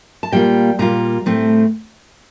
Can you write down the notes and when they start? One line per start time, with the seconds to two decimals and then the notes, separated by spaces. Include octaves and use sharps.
0.23 A5
0.32 A#2 G3 A#3 F4 G5
0.79 A#2 G3 A#3 F4 A#5
1.26 A2 A3 C4